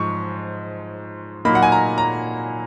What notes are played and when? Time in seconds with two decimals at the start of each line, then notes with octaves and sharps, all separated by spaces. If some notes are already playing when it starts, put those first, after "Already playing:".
Already playing: G#2 F3 G#3 C#6
1.45 A#2 F#3 A#3 D#4 B5
1.55 F#5
1.63 G#5
1.72 A#5
1.98 A#5